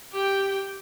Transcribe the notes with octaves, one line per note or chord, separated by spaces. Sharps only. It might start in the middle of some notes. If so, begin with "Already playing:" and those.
G4 G5